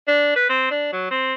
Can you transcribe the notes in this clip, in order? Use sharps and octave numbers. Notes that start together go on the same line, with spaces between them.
D4
B4
C4
D4
F#3
C4